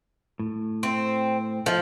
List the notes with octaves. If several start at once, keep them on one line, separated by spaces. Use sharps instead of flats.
A2
C4
F3 A4 D#5 F5